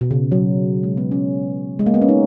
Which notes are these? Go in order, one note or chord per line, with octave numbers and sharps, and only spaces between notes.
B2
C#3
F#3
G#3
B3
C#4
G#3
A#3
B3
C#4
D#4